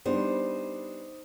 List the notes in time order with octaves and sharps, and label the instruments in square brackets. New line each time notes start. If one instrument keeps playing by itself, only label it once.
[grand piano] G3 B3 D4 [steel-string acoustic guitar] D#4 C5